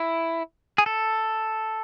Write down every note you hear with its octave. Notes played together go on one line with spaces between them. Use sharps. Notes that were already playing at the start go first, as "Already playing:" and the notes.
Already playing: E4
G#4
A4